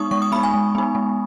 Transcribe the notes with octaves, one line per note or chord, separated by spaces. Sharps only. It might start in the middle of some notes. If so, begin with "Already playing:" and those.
Already playing: G#3 B3 D#4 C#6 D#6
G#3 C#6
D#6
B3 D#4 B5
G#5
G#3
B3 D#4
G#3